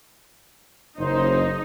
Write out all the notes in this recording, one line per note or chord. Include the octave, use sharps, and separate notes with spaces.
F#1 D#4 C5